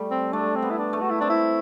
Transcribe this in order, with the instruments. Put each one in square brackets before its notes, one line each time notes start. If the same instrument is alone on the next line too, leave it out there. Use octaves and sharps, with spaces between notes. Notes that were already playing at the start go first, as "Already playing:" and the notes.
Already playing: [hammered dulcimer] G3 A3
[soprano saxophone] C4
[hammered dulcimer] A3 [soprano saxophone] D4
[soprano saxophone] C4
[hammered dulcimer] B3
[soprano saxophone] E4
D4
[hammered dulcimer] A3
[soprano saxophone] F#4
E4
[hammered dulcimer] C4 [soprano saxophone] D4
[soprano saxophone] E4